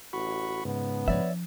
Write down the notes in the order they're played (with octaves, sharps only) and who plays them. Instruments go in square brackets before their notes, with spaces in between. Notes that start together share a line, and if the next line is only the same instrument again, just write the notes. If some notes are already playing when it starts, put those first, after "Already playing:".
[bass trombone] A1 [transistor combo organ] F#4 B5 C#6
[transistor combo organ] G#2 C#3 [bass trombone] B3
[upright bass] F3 D4 [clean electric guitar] C#5 D5 E5